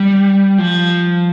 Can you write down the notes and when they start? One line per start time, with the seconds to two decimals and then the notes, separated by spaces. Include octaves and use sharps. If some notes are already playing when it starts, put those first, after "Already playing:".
Already playing: G3
0.58 F3